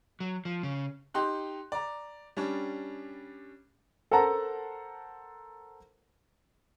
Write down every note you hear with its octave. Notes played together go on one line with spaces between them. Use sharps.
F#3
F3
C#3
D#4 G4 C6 F#6
D5 A#5
G3 C#4 D4
A4 A#4 C5 F#5 A5 A#5